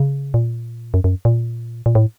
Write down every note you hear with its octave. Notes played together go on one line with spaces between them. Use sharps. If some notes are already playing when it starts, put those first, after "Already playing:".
Already playing: C#3
A#2
F#2
F#2
A#2
A#2
A2